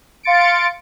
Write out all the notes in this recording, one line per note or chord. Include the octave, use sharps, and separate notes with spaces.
F5 C6 A6 C#7 D7